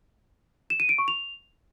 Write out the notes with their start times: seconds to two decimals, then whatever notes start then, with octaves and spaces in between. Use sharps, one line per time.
0.70 E7
0.80 D#7
0.89 D7
0.98 C#6
1.08 F7